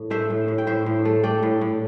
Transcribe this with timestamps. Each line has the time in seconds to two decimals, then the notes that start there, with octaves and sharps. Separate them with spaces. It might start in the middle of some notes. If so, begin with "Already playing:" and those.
Already playing: A2
0.10 A3 C5 E5
0.30 A2
0.48 A2
0.58 G5
0.67 A2 C5 E5
0.86 A2
1.05 A3
1.23 A3 D5 G5
1.43 A2
1.61 A2